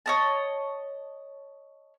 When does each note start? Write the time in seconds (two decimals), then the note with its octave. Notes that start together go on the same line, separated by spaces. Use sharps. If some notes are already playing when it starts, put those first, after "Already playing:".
0.06 C#5 D#5 A5